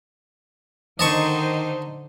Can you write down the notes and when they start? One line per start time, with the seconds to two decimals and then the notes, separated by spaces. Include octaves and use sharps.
0.99 D3 D#3 D#4 C5 D#5 A5 C#6